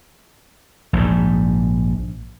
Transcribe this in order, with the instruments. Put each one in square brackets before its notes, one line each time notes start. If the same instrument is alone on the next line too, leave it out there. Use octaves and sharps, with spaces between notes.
[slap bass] A#1 G#2